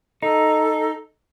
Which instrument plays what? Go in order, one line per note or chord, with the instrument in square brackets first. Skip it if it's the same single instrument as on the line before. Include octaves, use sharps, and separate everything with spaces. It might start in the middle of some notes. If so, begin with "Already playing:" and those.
[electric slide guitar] D#4 [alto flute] A4